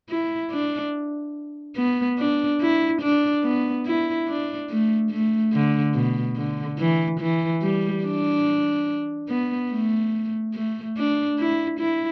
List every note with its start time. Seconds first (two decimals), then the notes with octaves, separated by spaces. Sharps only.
0.10 E4
0.51 D4
1.76 B3
2.19 D4
2.61 E4
3.02 D4
3.44 B3
3.86 E4
4.28 D4
4.70 A3
5.11 A3
5.53 D3
5.94 B2
6.36 D3
6.79 E3
7.20 E3
7.62 G3
8.04 D4
9.29 B3
9.71 A3
10.54 A3
10.97 D4
11.39 E4
11.80 E4